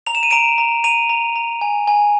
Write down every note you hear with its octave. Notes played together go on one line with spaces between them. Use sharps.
A#5 F7
E7
D#7
A#5 D7 E7
A#5
A#5 D#7 F7
A#5
A#5
G#5
G#5